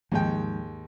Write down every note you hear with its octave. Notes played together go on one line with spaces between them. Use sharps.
D#2 G#2 F3 G#3 G5